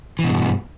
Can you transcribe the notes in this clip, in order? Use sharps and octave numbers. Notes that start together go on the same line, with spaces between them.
G2 B2 E3